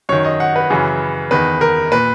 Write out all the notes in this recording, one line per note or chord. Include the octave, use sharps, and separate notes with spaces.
F#2 D#3 C#5
D#5
F#5
B4
F#2 C#3 E3
E2 D#3 B4
A#4
A#2 B4